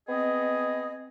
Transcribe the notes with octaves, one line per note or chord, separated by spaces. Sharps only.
B3 C4 G#4 D#5